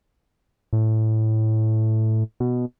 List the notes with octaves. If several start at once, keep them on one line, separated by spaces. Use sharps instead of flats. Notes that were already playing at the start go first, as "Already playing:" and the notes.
A2
B2